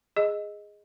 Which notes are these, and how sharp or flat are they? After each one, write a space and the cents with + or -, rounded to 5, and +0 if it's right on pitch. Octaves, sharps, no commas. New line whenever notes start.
G#4 -5 D#5 +0